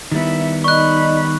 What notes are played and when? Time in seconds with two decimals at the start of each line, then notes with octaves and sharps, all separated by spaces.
0.12 D#3 G3 B3 E4 E5
0.64 D#4 D5 D#5 B5 C#6 F#6